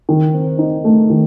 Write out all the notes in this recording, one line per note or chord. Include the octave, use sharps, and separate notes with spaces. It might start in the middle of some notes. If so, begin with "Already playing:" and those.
D#3
C4
D#4
A3
D#3